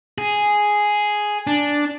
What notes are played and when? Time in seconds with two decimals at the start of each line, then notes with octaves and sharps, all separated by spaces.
0.18 G#4
1.47 D4